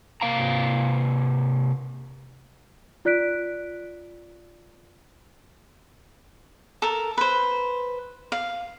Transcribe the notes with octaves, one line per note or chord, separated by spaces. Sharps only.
C3 A#3 F5 A#5
F4 D5 F#6 B6 D7
A4 A#4
B4 C5
F5